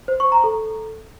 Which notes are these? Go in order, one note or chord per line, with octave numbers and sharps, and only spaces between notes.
C5
C#6
A#5
A4